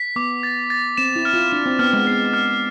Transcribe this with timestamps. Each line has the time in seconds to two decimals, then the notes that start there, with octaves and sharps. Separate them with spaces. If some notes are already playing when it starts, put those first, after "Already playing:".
Already playing: B6
0.16 B3 D6
0.43 A6
0.70 A6
0.97 C4 E7
1.16 E4
1.25 F6
1.34 F4
1.52 D4 E7
1.66 C4
1.79 B3 F6
1.93 G#3
2.07 B3 C7
2.34 F6